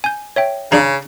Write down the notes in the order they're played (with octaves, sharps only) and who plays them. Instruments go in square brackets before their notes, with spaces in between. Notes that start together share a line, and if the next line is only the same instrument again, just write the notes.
[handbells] G#5 G6
C#5 E5 G5
[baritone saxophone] C#3 [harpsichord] D4 G#4 F5 [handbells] A#5